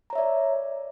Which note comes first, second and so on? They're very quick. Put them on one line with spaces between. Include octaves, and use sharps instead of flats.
A#5 C#5 E5 D5